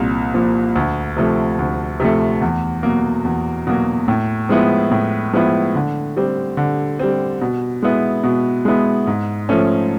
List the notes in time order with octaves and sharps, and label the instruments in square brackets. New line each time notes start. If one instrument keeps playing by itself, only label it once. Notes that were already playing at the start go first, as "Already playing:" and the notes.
Already playing: [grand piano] C2 A#2 F3
A#2 F3
D2
C3 F3 A3
D2
C3 F3 A3
E2
B2 F#3 A#3
E2
B2 F#3 A#3
A2
F3 G#3 B3 E4
A2
F3 G#3 B3 E4
D3
G3 C4
D3
G3 C4
B2
G#3 B3 E4
B2
G#3 B3 E4
G#2
F3 A3 C#4